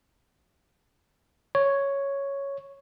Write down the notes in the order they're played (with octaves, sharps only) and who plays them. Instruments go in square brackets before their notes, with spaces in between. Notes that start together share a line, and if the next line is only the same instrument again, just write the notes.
[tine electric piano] C#5